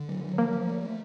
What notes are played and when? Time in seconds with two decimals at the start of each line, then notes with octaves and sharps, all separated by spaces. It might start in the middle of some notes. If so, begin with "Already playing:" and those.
Already playing: D3
0.09 F#3
0.23 F#3
0.38 F3 A#3
0.53 F3
0.68 A3